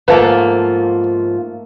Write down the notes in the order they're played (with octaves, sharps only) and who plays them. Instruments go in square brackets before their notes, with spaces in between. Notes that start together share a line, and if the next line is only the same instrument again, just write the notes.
[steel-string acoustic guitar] G#2 F3 [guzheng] A3 A#3 [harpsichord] B4 A5